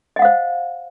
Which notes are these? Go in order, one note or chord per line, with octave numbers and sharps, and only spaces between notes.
C5 D#5 F5 F#5